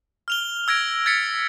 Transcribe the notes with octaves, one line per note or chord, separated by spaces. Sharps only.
F6 F7 G7
E6 G#6 A#6 D7
G#6 A6 B6 C#7